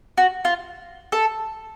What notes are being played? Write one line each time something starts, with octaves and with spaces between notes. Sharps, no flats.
F#4
F4
A4